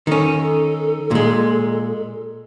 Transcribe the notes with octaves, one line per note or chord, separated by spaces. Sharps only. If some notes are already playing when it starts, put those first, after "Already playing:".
D#3 C#4 A4
A#2 G#3